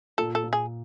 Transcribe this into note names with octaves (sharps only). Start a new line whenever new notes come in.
A#2 A4
A4
A#2
G#4